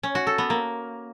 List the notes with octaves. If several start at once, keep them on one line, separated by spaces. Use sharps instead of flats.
C#4
F#4
A4
B3
A#3